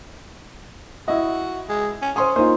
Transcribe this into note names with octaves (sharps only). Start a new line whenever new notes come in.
E4 F#4 D#5
G#3
C#4
C#4 C5 C6 D#6
A#3 D#4 F4 C5